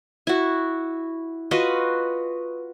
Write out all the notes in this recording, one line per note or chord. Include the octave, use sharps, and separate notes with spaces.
E4 F#4
F4 F#4 B4 D#5